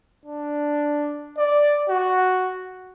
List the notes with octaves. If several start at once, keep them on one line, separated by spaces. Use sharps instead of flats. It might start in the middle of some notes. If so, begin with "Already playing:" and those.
D4
D5
F#4